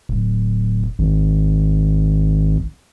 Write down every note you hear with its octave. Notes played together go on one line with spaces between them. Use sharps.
D1
G#1